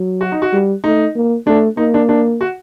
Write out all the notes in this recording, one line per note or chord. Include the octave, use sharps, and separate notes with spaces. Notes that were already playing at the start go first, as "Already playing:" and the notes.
Already playing: F#3
F#4
D#4
F#4
G3
A3 D#4
A#3
A3 D4
A#3 D#4
D4
D4
F#4